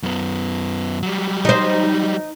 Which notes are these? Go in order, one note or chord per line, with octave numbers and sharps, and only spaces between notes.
F#2 B3
F#3 G3
D#4 C5